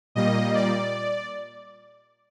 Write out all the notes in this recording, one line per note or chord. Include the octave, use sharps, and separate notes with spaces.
A#2 G3 A#3 D#5
D5